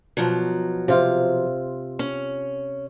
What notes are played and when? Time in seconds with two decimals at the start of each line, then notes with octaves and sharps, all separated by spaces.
0.17 B2 F3 F#3
0.88 C3 F4
1.99 C#4